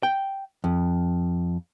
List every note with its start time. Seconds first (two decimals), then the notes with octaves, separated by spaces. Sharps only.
0.03 G5
0.64 F2